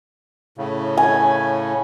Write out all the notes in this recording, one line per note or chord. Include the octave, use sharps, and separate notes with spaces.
A2 C#3
G#5